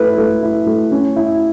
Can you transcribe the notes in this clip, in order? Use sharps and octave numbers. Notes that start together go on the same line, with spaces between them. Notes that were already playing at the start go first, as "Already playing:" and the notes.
Already playing: A3 E4 B4
A3
E4
A3
C#4
E4